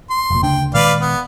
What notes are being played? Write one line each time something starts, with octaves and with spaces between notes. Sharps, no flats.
C6
F1 A#2
D2 C#3 D4 G5
A#2 D#3 G#3 B4 D5 F5
B3